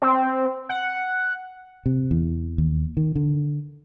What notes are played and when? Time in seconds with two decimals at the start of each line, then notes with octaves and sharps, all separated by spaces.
0.02 C4
0.69 F#5
1.86 C3
2.11 E2
2.58 D#2
2.97 D#3
3.15 D3